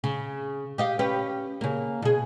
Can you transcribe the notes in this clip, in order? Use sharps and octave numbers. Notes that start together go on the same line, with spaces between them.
C#3
G4 D#5 F5
C#4 G4 B4
C#3 A#3
B2 G#4